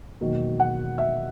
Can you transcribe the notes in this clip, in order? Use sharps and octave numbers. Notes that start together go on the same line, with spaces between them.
E1 D#2 D#3 F#3
F#5
E5